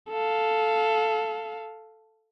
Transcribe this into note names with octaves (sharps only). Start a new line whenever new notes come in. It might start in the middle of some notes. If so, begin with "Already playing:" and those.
A4 F5